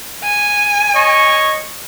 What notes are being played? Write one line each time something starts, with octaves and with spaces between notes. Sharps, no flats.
G#5
C#5 D#5 C#6